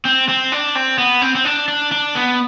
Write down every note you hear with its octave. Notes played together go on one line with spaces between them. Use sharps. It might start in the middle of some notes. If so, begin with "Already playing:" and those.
C4
C4
D4
C4
B3
C4
C4
D4
D4
D4
B3